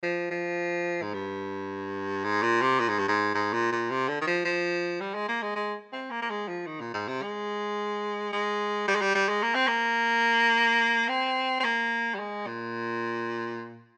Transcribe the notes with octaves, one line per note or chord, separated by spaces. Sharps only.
F3
F3
G#2
G2
G#2
A#2
C3
A#2
G#2
G2
G#2
G#2
A#2
A#2
C3
D3
D#3
F3
F3
G3
G#3
A#3
G#3
G#3
C4
A#3
A#3
G#3
F3
D#3
A#2
G#2
C3
G#3
G#3
G3
G#3
G3
G3
G#3
A#3
C4
A#3
C4
C4
A#3
G3
G#3
A#2